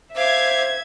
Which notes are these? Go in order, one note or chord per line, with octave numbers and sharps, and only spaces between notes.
C5 E5 F5 D6 G#6